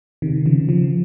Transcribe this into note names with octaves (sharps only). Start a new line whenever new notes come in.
C3 D#3
C#3 F3
C#3 F3